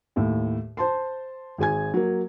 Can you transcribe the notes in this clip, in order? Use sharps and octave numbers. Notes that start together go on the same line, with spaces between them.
D#2 A2
C5 A5 C6
G#1 G#4 G#5 G#6
F#3 A#3